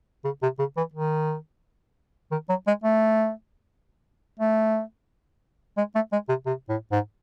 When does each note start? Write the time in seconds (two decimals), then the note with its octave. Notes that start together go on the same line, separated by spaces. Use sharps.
0.25 C#3
0.42 C3
0.59 C#3
0.77 E3
0.94 D#3
2.32 D#3
2.49 F#3
2.67 G#3
2.84 A3
4.40 A3
5.77 G#3
5.95 A3
6.12 G#3
6.29 C3
6.46 C3
6.69 A2
6.92 G#2